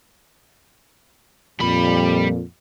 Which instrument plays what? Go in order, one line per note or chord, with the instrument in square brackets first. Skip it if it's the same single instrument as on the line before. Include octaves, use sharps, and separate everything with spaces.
[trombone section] F2 A#2 [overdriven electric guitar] G3 B5